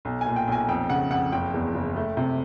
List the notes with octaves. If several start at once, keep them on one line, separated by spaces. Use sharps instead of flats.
B1
G#5
A#2
G5
B1 G#5
F2 G5
C#3 F#5
F2 F#5
F#1 G5
E2
F#1
A3
C3